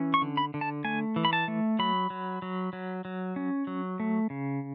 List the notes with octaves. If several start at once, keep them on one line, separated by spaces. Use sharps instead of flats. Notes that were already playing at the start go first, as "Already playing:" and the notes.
Already playing: E3 C#4
C#6
D3
B5
D3
A5
A3 G#5
E3
B5
A5
A3
F#3 B5
F#3
F#3
F#3
F#3
C#4
F#3
A3
C#3